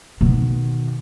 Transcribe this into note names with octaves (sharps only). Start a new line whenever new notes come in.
B2 D#3